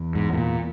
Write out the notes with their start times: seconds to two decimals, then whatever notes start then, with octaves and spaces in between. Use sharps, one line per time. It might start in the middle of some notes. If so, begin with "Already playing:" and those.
Already playing: E2
0.15 G#2
0.33 G#2
0.37 A#2